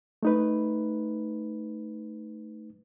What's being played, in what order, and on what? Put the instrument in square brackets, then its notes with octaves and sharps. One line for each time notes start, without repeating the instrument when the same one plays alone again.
[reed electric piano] A3 D#4 B4